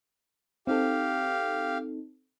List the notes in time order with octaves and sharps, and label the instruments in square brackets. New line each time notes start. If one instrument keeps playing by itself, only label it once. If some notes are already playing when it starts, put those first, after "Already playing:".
[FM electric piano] C4 D#4 A4 [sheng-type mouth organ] G4 F5